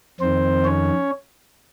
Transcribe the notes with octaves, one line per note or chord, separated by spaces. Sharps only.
F2 D#3 C4 C5
C#4 C#5